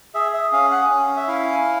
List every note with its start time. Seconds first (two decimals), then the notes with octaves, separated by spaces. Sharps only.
0.15 G#4 E5
0.34 E5
0.52 C#4 F5
0.72 F#5
0.90 C#4
1.17 E5
1.28 E4 F5